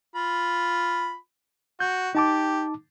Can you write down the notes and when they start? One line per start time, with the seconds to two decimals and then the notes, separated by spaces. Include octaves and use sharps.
0.15 F4 B5
1.80 F#4 G6
2.15 D#4 G4 A5 D6